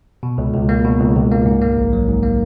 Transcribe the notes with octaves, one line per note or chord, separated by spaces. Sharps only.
B2
C#2
C#2
A#3
B2
C#2
C#2
A#3
G#2
A#3
A#1
F#3
G#2
A#3